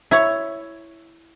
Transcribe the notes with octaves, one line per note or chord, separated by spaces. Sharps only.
E4 C#5